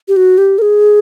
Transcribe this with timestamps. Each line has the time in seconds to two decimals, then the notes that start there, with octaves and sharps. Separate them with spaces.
0.08 G4
0.17 F#4
0.38 G4
0.59 A#4
0.62 G#4